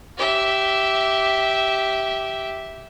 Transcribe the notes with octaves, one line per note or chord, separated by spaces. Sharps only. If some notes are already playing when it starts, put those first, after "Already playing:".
G4 E5